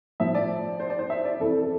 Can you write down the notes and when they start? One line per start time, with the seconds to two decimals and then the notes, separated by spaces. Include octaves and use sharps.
0.20 A2 F3 E5
0.35 D5
0.80 C5
0.90 D5
0.99 C5
1.10 E5
1.25 D5
1.40 F2 E3 A4
1.63 A4